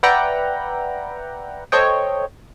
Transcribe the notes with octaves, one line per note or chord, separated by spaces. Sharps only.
B4 D5 E5 F#5 G5 A#5
A4 C5 C#5 D#5 G5